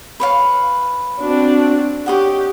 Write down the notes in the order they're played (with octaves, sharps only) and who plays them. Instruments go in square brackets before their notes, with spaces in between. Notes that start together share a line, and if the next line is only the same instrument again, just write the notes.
[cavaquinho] B4 C#5 F5
[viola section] C4 D4 F#4
[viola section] G4 [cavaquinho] C#5 D#5 F#5